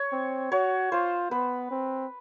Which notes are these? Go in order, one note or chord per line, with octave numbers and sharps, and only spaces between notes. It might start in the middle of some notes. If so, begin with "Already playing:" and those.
Already playing: C#5
C4
F#4 C#5
F4 C5
B3 B4
C4